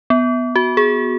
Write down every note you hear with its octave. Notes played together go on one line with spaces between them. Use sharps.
B3
F#4
G#4